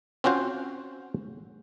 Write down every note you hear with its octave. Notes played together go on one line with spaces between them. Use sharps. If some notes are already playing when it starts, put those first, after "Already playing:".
C4 C#4 F4 F#4 C5